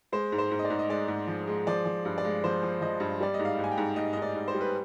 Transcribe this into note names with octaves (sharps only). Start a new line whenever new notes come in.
G#3 C5
G#2
C5
G#2
D#5
D5
G#2
D#5
G#3 D5
G#2
F3
G#3
F3 D5
F3
G2
D5
G#3
F3 C5
F3
F3 D#5
G2
G3 D5
D#5
G#2
F5
G#2 G#5
G5
G#2
G#2 D#5
G#2 D#5
D5
G#2
C5
G3
B4